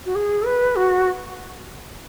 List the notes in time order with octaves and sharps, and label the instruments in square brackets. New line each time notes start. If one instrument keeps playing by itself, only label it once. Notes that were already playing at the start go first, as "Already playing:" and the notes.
[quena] F#4
G#4
B4
F#4